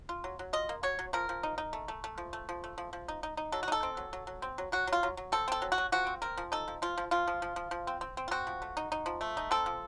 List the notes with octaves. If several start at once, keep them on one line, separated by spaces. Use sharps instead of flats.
F4
F#3
F#3
F4 D#5
A#3
F#3 C#5
F#3
F3 A#4
F3
D#4
D#4
A3
A3
A3
F3
A3
F3
A3
F3
F3
D#4
D#4
D#4
F#3 A4
F#4
D#4 A4
C4
F#3
F#3
F#3
C4
F#3
F#3 F#4
F#3
F4
F#3
F#3
C4 A4
C4 A4
F#3
F#4
F#3
F3 F#4
C4
C4 A#4
F3
D#4 A4
F3
F3 F4
F3
F3 F4
F3
F3
F3
F3
C4
C4
C4
F4
C4 F#4
F3
A3
D#4
D#4
F3
A3
D#4
C4 A4
F3